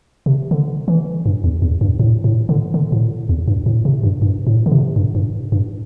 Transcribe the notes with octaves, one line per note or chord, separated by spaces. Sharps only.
C3
D3
E3
G2
E2
E2
G2
A2
A2
D3
D3
A2
E2
G2
A2
C3
G2
G2
A2
D3
C3
G2
G2
G2